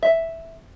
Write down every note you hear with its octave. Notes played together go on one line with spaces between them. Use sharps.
E5